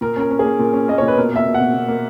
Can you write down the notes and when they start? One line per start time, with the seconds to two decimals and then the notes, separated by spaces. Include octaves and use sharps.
0.01 A#2 A#4
0.16 C#4 A#4
0.31 C#4
0.39 A#3 G#4
0.59 A#2
0.73 C#4
0.88 A#3 D#5
0.98 A#2 C#5
1.08 B4
1.16 B2 A#4
1.31 A#3 E5
1.45 B2
1.54 F#5
1.60 B2
1.74 B2
1.88 A#3